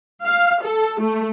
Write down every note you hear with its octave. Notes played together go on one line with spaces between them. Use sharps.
F5
A4
A3